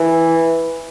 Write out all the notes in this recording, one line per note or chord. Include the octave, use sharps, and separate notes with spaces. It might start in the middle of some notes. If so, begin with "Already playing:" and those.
Already playing: E3